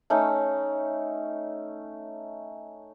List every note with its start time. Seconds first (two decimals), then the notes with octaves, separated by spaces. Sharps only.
0.10 A3 C#4 D#4